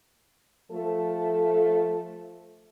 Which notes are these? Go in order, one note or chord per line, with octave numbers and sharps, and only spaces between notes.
F3 A3 A4